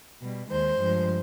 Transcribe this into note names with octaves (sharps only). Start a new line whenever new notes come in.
B2 G3
D#2 D#3 G#3 C5
G2 F3 G#3